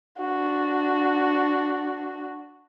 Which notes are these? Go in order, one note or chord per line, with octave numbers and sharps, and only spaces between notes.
D4 F#4